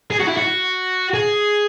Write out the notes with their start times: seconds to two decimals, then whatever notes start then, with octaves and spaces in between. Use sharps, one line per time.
0.11 G#4
0.20 F#4
0.28 E4
0.37 F#4
1.14 G#4